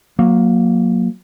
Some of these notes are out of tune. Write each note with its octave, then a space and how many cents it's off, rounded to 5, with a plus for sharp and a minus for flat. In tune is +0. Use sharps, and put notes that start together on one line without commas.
F#3 -25 A#3 +0